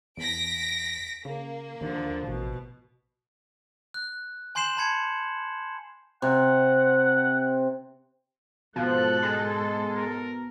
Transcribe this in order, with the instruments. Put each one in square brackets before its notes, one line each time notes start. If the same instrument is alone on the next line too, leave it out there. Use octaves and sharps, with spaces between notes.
[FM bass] E2 [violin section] A#6 B6 D7
[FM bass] C#3 [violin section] A#3
[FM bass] D#2 [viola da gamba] D3 F3
[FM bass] A1 [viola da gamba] B2
[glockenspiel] F#6
G#5 C6 G6 C7 E7 F#7
A5 B5 G#6 C#7
[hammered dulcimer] C3 [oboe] F#5
[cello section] G#2 A4 [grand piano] B2 [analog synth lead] F3 [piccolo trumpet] F#6
[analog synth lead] G#3
[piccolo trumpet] A#4